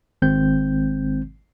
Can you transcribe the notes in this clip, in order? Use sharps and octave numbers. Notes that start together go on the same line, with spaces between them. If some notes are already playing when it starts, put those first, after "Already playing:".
G#1 D#3 G#3 C4 G6